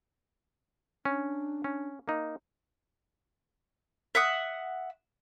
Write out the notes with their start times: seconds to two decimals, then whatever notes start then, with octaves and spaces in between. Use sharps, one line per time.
1.05 C#4 D4
1.64 C#4
2.08 A#3 D#4
4.15 E5 F#5 D#6